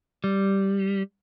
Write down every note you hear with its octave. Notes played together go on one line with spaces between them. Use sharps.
G3